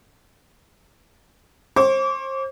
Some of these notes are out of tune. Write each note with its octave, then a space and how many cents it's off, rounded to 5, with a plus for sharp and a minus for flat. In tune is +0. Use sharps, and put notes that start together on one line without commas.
C5 +35 D6 -35